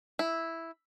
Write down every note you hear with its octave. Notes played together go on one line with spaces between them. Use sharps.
E4